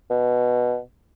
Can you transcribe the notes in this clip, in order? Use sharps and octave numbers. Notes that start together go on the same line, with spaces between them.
B2